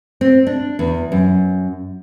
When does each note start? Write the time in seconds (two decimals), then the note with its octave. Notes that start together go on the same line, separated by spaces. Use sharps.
0.21 C4
0.47 D4
0.79 E2
1.12 F#2